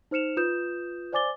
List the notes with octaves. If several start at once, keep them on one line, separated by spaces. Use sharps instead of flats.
D#4 C5 F6 C#7 E7 F7
F4 B4 D#6 G6 E7
C5 D5 G#5 D6 A6 G7